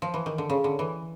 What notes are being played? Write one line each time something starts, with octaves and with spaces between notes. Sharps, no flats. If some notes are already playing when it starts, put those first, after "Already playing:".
F3
E3
D#3
D3
C#3
D3
E3